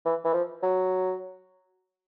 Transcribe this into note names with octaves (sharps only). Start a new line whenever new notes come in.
E3
E3
F3
F#3